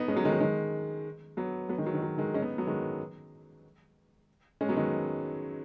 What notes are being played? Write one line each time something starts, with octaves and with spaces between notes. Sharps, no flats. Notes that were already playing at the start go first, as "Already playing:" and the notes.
Already playing: B3 D#4
G#3 C#4
F#3 B3
D#3 G#3
F#3
D#3 G#3
F#3 B3
F#3 B3
D#3 G#3
F#3
D#3
F#3
D#3 G#3
G#3 C#4
B3 D#4
F#3 B3
D#3 G#3
G#3 C#4
F#3 B3
D#3 G#3